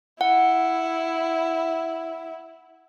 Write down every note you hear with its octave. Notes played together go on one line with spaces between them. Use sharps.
E4 F#5